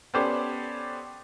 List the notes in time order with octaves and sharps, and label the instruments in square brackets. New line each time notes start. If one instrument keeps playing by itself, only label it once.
[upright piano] B3 C#4 G4 A4 C5 D5